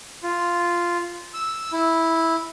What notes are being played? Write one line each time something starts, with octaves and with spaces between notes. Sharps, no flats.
F4
E6
E4